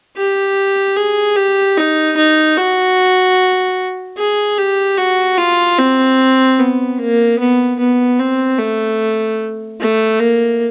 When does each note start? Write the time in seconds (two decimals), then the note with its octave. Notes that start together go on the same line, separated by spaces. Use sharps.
0.16 G4
0.96 G#4
1.36 G4
1.77 D#4
2.17 D#4
2.57 F#4
4.17 G#4
4.58 G4
4.98 F#4
5.37 F4
5.78 C4
6.59 B3
6.98 A#3
7.39 B3
7.79 B3
8.19 C4
8.59 A3
9.80 A3
10.20 A#3